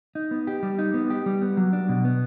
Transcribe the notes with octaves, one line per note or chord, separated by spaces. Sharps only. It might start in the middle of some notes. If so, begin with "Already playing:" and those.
D#4
B3
G4
G3
D#4
B3
G4
G3
B3
F#3
D4
B2
B3